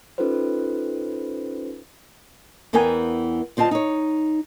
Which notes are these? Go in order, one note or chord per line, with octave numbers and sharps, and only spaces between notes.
C#4 D#4 F4 A4 B4 C5
E2 E3 B3 A#4 G5 G#5
D2 C4 F4 D#5 A5
D#4 C#5